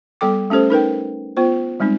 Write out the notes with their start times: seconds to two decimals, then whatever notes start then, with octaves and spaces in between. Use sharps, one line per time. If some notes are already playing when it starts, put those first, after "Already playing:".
0.21 G3 B3 A4 G5 D6
0.50 A3 C#4 G4 A4 C5
0.70 D#4 A#4 B4 G5
1.37 B3 F4 C5
1.80 G3 G#3 C4 D#4